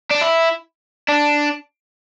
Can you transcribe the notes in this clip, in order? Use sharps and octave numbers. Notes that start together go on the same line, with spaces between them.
D4
E4
D4